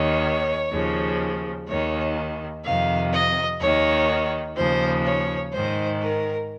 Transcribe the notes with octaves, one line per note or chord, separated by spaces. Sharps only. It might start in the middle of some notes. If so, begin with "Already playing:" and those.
Already playing: D#2 D#3 C#5
D#2 C#3 F3
D#2 D#3 C#5
F2 C3 D#3 F5
D#5
D#2 D#3 C#5
D#2 C#3 F3 C5
C#5
G#2 D#3 C5
A#4